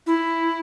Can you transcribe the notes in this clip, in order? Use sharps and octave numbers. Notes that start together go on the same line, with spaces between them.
E4